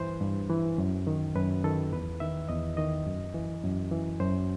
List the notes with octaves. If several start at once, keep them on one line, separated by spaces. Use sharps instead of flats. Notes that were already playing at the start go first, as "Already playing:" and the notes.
Already playing: G2 E3 B4 C5
G2
E3
F#2
D#3
F#2 B4
D#3 A4
E2 B4
D#3 E5
E2 D#5
D#3 D#5
F#2
E3
F#2
E3
F#2 C5